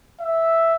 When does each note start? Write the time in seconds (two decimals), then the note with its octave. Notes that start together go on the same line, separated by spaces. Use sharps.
0.20 E5